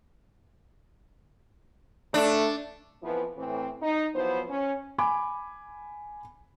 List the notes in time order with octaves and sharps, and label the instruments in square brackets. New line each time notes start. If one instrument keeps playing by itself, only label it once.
[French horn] A3 [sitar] D4
[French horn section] F2 E3 F3 B3 E4 B4
A2 E3 C4
D#4
F3 F#3 B3 E4 C5
C#4
[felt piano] G#5 B5 D6